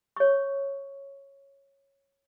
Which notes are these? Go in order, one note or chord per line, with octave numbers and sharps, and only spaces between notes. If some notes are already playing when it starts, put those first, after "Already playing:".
C#5 C#6